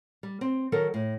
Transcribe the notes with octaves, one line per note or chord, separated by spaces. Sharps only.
G3
C4
D#3 F#3 A4 A#4
A2